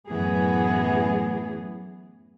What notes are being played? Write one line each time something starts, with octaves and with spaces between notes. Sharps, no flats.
F#2 A2 E3 B3 G#4